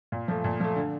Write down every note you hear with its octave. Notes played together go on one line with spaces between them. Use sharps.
A#2
F3 A3
A#2
F3 A3
D3